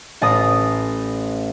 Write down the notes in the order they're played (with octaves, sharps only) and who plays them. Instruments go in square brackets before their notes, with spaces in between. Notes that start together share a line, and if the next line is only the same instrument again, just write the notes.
[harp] A1 A5 A#5 D#6